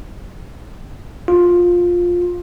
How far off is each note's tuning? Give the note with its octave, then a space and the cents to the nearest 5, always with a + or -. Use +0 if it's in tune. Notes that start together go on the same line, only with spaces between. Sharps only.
F4 +10